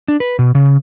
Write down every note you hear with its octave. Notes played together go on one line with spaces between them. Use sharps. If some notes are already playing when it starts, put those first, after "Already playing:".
D4
B4
B2
C#3